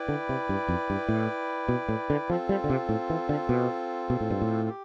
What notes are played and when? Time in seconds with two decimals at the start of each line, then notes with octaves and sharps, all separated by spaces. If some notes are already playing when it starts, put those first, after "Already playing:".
Already playing: E4 B4 D5 G5
0.09 D3
0.29 C3
0.49 G2
0.69 F2
0.90 G2
1.09 A2
1.69 B2
1.89 A2
2.10 D3
2.30 F3 C4 F4 A4
2.49 G3
2.64 D3
2.70 C3
2.89 A2
3.10 E3
3.29 D3
3.49 B2
4.10 B2
4.21 A2
4.30 G2
4.42 A2
4.69 G4